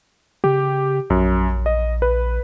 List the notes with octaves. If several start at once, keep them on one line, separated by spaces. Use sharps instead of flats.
C#3 G4
A#1 F#2
D#5
B4